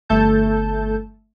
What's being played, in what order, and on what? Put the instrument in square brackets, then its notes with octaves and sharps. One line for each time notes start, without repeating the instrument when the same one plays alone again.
[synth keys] G1 A3 A4 A5 G6